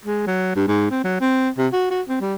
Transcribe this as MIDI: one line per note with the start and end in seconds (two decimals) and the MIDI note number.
0.05 0.24 56
0.27 0.54 54
0.56 0.65 43
0.68 0.91 44
0.91 1.04 60
1.04 1.19 54
1.21 1.49 60
1.58 1.68 48
1.73 1.89 66
1.91 2.02 66
2.09 2.19 60
2.21 2.35 55